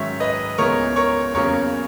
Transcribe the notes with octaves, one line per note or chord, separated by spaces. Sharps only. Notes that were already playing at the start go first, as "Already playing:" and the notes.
Already playing: G#2 D#3 F#3 C#4 C#5 E5
B4 D#5
C#2 C#3 E3 B3 A#4 C#5
A#4 C#5
E2 C#3 F#3 A#3 C#4 A#4 C#5